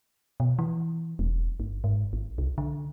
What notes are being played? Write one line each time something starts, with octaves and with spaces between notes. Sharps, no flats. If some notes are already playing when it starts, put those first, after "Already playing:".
B2
E3
E1
G1
G#2
G#1
C2
D3